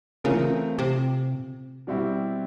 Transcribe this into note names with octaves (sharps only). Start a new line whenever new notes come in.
C#3 E3 A3 C4 F4 A#4
C3
B2 G3 C4 E4 G4